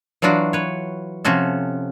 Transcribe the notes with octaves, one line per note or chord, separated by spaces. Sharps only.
E3 F#3 D4 F4 F#4
B4 C#5
C3 F3 C#4 F#4 A4